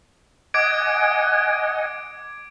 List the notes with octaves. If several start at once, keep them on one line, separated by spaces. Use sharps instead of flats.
D#5 F#5 G#5 D6 G#6 D7